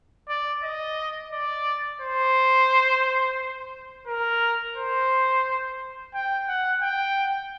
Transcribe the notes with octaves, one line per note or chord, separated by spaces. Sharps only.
D5
D#5
D5
C5
A#4
C5
G5
F#5
G5